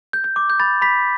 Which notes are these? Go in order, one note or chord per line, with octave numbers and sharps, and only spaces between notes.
G6
G6
D6
G6
B5 A6
B5 B6